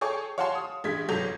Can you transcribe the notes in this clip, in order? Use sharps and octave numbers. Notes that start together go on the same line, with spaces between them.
G#4 A4 C#5 G5 G#5 C#6
C#5 F5 F#5 G#5 A5 C6
D#6
A1 G2 G#3 G#6 B6
G1 G#2 F#3 A4 G6 F7